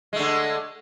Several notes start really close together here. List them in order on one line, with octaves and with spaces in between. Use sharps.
G#3 A3 D3